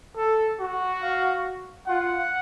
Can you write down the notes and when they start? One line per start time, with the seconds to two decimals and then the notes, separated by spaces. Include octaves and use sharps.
0.17 A4
0.59 F#4
1.02 F5
1.87 F4 F#5